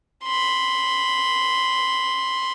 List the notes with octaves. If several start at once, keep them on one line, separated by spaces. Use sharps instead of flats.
B5 C6